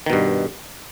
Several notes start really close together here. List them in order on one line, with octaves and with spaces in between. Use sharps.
D#3 B2 G2